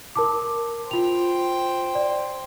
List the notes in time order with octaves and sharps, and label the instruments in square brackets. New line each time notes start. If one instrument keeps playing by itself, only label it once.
[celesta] A#4 A5 D6
[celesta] F4 F7 [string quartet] C5 G5
[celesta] D5